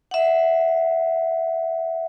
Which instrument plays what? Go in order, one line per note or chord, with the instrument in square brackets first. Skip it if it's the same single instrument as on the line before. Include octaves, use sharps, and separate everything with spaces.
[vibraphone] E5 F#5